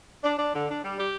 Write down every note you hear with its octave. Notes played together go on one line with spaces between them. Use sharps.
D4
D4
D3
D4
G3
G4